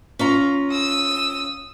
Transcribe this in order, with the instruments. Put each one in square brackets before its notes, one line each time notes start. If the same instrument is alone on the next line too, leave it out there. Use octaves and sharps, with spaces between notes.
[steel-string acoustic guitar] C#4 F4 A#5
[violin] D#6 E6